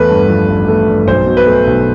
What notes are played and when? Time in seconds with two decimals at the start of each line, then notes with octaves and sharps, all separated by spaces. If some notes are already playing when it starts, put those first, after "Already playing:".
Already playing: E2 A3 B4
0.09 G2
0.29 F3
0.48 A1
0.68 A3
0.88 G2
1.07 B1 C5
1.27 B2
1.37 B4
1.46 A3
1.67 B1